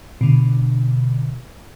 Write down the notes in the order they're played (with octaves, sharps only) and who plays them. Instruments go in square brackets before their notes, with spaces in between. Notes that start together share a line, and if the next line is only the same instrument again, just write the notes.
[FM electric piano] B2 D3